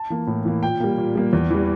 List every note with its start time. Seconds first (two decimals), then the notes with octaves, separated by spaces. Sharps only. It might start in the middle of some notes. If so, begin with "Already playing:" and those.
Already playing: A5
0.10 E3 A#3
0.27 A2
0.45 E3 A#3
0.63 A#2 G5
0.80 G3 A#3
0.98 A#2
1.15 G3 A#3
1.33 E2
1.50 E3 G3